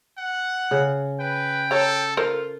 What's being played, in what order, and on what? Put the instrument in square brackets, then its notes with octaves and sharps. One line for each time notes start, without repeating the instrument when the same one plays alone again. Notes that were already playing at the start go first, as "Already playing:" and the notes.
[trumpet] F#5
[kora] C#3
[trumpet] B4 [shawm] G5
[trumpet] A4 [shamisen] C#5 A#5
[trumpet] F4 [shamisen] A4 A#4 C5